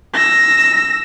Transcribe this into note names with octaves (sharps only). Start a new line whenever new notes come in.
E6 A#6